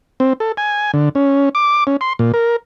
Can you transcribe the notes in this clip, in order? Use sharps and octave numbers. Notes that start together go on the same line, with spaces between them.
C4
A4
G#5
D3
C#4
D6
C#4
C6
A#2
A#4